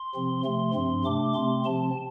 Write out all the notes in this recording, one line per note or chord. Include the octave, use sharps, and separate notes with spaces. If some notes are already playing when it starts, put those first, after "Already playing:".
Already playing: C6
C3 F3 C4
C3 F3 A3 C6
G2 F3 C4 C6
C3 A3 D4 D6
C3 A3 C4 C6
C3 F3 C4 A5